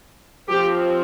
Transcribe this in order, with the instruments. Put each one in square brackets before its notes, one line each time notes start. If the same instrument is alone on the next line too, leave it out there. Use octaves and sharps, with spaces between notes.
[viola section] F3 C4 G4